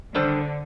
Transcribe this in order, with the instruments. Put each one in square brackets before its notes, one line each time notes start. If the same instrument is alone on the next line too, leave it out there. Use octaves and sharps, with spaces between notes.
[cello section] D3 [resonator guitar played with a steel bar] D#3 G3 D4 A4 C5